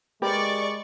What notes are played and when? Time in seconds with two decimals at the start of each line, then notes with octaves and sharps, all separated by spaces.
0.22 G#3 G4 A#4 B4 D5 C#6